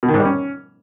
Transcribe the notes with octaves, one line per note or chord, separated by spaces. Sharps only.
B2
D#3
G#2
G3
C#4